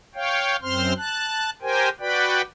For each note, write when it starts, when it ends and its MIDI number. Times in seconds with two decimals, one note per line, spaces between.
0.15 0.56 73
0.15 0.56 77
0.15 0.56 79
0.62 0.93 42
0.62 0.93 60
0.62 0.93 72
0.62 0.93 84
0.62 0.93 89
0.97 1.50 81
0.97 1.50 90
1.62 1.89 67
1.62 1.89 70
1.62 1.89 72
1.62 1.89 79
1.62 1.89 80
2.00 2.42 66
2.00 2.42 71
2.00 2.42 74
2.00 2.42 79
2.00 2.42 83